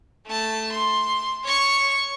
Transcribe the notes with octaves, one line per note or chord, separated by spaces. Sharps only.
A3 A5
C6
C#5 C#6